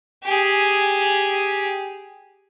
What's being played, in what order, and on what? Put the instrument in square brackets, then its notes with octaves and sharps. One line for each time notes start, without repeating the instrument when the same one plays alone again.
[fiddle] G4 G#4